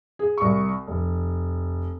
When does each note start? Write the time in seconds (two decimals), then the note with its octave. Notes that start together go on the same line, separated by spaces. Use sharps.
0.19 G#4
0.38 C2 C#6
0.87 F1